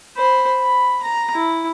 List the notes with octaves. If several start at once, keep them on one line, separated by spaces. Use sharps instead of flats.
C5 B5
B5
A#5
E4